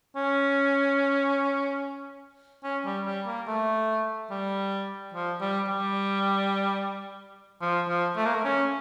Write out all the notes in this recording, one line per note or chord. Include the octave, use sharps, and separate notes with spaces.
C#4
C#4
G3
G3
A#3
A3
G3
F3
G3
G3
F3
F3
A3
A#3
A3
C#4